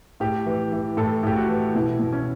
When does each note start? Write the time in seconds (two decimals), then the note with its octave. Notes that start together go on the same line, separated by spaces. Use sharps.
0.20 A2 G4
0.46 E3
0.72 E3
0.97 A2 A4
1.23 A2 G4
1.36 F#4
1.49 E3
1.75 B2 E4
1.99 B2
2.12 C#4